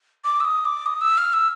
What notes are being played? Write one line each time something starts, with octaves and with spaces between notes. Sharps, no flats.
D6
E6
D#6
D6
D#6
E6
F6
E6